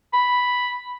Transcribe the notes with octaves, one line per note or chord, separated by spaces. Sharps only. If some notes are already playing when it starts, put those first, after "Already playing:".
B5